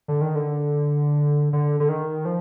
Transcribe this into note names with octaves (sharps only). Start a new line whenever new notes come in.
D3
D#3
D3
D3
D3
D#3
F3